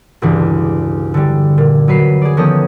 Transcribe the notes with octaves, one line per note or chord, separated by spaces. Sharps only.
E1 C#2 G2 E3 D4
D3 G3
A#2
F#3 B4 C7
G#4 D5
D#3 F3 B3 C#4 A4 D#5